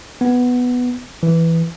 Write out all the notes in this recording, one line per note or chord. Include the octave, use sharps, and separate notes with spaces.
B3
E3